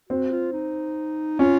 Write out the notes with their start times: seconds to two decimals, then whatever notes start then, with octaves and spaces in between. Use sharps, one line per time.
0.09 C4 F#4
0.32 F4
0.53 D#4
1.39 C#4 F4